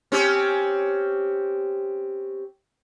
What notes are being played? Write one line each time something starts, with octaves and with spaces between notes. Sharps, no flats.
C4 C#4 G4